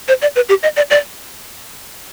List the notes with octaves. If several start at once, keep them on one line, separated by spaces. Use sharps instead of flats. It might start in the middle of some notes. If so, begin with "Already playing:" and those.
C5
D5
B4
G4
D#5
D5
D5